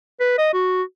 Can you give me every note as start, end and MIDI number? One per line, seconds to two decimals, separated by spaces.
0.20 0.35 71
0.38 0.49 75
0.53 0.82 66